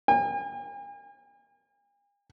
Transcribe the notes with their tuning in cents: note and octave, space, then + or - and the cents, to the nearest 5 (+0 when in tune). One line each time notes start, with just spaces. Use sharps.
G#5 -45